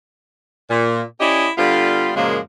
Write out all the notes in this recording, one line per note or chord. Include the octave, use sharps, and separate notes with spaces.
A#2
C#4 E4 G4 D5 D#5
D3 G3 B3 F4
F#2 A#2 C#3 F3 G#3 A#3